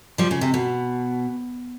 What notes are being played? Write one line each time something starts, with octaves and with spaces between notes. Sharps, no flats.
F3 G3
C#3
C3
B2